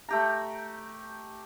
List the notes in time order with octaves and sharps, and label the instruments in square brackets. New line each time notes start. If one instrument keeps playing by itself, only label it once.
[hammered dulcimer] A3 G4 A#5